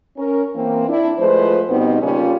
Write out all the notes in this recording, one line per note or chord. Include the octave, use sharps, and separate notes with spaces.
C#4 A#4
E3 A#3 C4
D4 E4
F3 G#3 A3 B4 C5
B2 G3 B3 C4 D#4
C#3 G3 A#3 C#4 F4